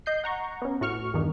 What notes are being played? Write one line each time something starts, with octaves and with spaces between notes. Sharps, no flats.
D#5 G6 C7
F#5 A#5 C#6
B3 C#4
A2 F#4 C#6 F6
E2 G2 D#3